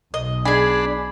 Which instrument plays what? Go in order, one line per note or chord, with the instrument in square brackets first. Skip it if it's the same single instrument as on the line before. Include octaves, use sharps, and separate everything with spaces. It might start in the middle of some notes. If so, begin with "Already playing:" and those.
[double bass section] B1 [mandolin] D#5
[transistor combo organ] D4 B5 [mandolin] G#4 G#5